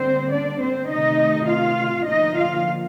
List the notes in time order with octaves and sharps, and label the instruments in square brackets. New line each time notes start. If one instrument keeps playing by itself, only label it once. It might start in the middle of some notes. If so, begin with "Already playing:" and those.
Already playing: [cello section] D3 G3 A#3 C4 C5
D4 D5
C4 C5
C3 D#3 A3 D#4 D#5
F4 F5
D3 F3 A#3 D#4 D#5
F4 F5